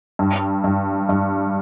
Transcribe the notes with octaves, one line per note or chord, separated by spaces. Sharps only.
G2
G2
G2